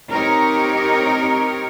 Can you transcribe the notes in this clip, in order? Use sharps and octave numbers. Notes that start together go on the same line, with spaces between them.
C4 D#4 G4 A#4 C#5